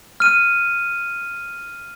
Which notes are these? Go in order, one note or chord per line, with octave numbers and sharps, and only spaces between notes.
F6 D#7